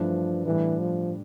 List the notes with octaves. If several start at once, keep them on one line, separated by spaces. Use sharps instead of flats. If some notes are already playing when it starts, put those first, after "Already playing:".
Already playing: G2 E3 F3 A3 D4
A2 E3 G3 D4
F3